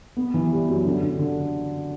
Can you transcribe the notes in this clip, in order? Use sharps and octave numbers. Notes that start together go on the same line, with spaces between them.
B3
E3
G3
F#2
D3
D3
D3